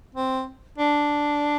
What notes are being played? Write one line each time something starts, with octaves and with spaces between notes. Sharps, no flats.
C4
D4